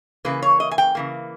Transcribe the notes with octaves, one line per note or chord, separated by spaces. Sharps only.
C#3 E3 A#3 B4
C#5
D#5
G#5
G5
C#3 E3 A#3